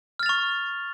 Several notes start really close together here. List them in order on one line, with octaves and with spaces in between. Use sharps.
F6 A6 F7 C#6